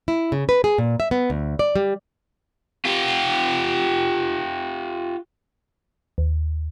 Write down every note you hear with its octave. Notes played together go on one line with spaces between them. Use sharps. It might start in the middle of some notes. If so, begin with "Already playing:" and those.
E4
C#3
B4
G#4
A#2
E5
B3
D2
D5
G3
F4 G4
D#2